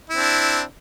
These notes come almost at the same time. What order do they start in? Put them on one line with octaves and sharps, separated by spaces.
E4 C4 D4